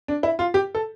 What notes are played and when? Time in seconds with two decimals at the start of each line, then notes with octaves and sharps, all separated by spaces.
0.08 D4
0.23 E4
0.39 F4
0.54 G4
0.75 A4